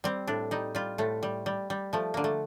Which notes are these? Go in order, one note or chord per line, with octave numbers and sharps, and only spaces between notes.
G3 C4
A2 D4
G3 D#4
G3 F4
A2 A3
G3
G3
G3
F3 A3
D3 A#3
A3